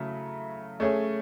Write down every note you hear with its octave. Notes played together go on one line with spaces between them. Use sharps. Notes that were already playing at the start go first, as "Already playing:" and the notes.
Already playing: C#3 F#3 A3 E4
A3 C#4 G#4 C#5